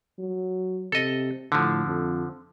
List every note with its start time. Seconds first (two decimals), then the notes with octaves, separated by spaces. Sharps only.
0.19 F#3
0.92 C3 A4 D#5
1.52 A2 D3 F3
1.86 F2